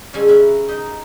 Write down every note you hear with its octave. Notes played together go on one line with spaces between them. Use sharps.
F2 C#3 G3 C#4 A4 G#5
C#4 A#4 B4 E5
D#4 G4 D#5